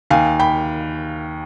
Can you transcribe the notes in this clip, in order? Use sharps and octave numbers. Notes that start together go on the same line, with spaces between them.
D#2 F5 G#5
G5 B5